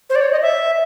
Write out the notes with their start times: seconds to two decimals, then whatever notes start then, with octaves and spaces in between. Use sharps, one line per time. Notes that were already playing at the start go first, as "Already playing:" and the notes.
0.10 C5
0.15 D5
0.21 C#5
0.32 D#5
0.42 E5